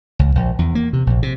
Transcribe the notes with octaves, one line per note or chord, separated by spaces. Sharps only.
C#2
A#1
E2
A#3
C3
A#1
C3